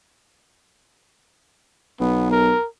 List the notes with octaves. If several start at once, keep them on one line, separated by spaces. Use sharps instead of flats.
B1 B3
A#4